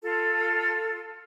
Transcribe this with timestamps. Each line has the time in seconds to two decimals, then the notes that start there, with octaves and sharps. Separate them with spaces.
0.02 F4 A4